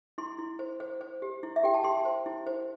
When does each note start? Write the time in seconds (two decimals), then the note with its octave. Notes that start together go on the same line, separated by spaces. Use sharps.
0.18 E4 C6
0.39 E4
0.59 C5
0.80 C5
1.01 C5
1.22 G4
1.43 E4
1.56 E5
1.63 G4 G5
1.74 A5
1.84 G4 C6
2.05 C5
2.26 E4
2.47 C5